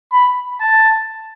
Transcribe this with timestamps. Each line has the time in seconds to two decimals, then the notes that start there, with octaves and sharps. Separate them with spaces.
0.12 B5
0.61 A5